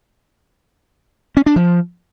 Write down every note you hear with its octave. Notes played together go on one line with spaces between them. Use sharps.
C#4
D4
F3